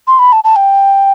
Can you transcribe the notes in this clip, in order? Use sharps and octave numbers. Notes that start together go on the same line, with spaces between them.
C6
B5
A5
A5
G5